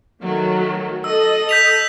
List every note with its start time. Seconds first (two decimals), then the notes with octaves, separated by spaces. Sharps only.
0.20 D#3 F#3 A3
1.04 A4 D#5 E6
1.49 G6 B6 F7